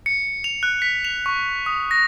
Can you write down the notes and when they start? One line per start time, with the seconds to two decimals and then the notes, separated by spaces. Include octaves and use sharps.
0.06 C#7
0.44 F7
0.63 F#6
0.82 B6
1.05 F7
1.26 C#6
1.66 D#6
1.91 A#6